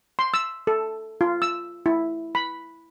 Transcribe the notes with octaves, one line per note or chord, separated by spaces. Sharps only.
C6
E6
A4
F4
E6
E4
B5